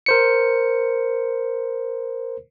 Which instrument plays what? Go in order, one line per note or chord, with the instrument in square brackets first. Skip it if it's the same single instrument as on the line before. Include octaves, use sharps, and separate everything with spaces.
[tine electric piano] A#4 C5 C#7